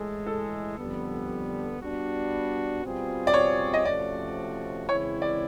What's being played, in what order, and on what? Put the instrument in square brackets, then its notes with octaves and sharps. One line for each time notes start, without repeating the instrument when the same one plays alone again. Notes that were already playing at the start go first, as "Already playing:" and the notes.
Already playing: [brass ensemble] A2 E3 G#3 [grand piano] A4
[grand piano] A4
[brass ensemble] F2 D3 G3 B3
G3 B3 D4 F#4
B2 G3 C4 F4 G#4
[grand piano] D5
C#5
D#5
[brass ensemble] C3 F3 A3 C#4 F#4 [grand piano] D5
[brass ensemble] C#3 E3 G#3 C4 E4 [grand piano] C#5
[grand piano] D5